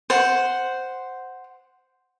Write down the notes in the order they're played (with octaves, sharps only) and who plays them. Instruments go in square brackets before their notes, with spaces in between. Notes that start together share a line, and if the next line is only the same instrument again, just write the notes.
[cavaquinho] C5 F#5